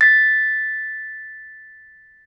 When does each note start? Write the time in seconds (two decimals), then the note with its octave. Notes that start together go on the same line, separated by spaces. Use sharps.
0.01 A6 B6